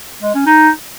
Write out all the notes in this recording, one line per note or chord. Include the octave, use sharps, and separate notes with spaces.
G#3
C#4
D#4